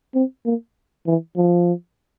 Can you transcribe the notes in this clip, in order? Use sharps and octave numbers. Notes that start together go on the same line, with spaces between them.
C4
A#3
E3
F3